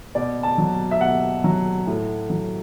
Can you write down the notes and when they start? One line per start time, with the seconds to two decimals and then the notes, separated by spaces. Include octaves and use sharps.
0.15 B2 D5
0.43 A5
0.58 F#3
0.91 E5
1.01 B2 F#5
1.44 F#3
1.87 A2
2.30 F#3